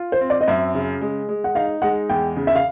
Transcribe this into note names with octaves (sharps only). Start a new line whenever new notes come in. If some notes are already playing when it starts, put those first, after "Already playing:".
Already playing: F4
C5
C4
D5
D#5
F#2 E5
C#3
G#3
G#3
F#5
D#4 F5
G#3 F#5
E2 G5
C#3
E5
F5